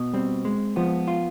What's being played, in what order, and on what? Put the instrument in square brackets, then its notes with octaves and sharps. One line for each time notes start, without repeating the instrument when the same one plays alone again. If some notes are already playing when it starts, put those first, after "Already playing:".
Already playing: [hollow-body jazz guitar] B2
[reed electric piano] G3 [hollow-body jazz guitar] C4
[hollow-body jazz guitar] G#3
[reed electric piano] F3 [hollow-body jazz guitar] B3
[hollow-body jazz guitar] F4